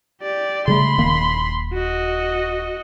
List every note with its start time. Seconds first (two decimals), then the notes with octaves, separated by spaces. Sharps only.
0.22 G4 D5
0.68 C#3 G3 A3 B5 C6
0.98 D#1 D#3 A#3
1.74 F#4 D#5